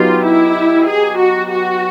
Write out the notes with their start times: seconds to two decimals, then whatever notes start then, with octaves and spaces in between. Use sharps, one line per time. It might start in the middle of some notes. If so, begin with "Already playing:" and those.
Already playing: F#3 B3 D#4 F4 G4
0.25 E4
0.87 G#4
1.20 F#4
1.52 F#4